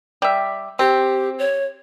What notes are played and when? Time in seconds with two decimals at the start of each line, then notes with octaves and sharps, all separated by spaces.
0.22 G3 E5
0.79 C4 G4
1.39 C#5